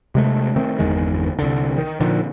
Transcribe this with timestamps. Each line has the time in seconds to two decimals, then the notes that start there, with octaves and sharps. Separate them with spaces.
0.15 C3 G#3 A3
0.56 D#3 A3 C4
0.79 G1 E2 D#3 G#3
1.39 C2 D3
1.78 D#3
2.00 A#2 D3 D#3 F3